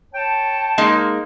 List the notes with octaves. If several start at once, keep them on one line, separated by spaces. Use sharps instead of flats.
C#5 G5 A5
G#3 A#3 D#4